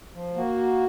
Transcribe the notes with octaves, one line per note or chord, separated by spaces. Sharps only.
F3
A#3 F#4